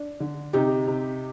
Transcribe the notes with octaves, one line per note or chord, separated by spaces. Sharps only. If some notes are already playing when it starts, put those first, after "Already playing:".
Already playing: D4
D3
C3 D#4 G4
C3